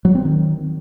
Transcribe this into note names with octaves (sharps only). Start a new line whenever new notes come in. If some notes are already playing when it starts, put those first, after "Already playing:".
F#3
C4
D#3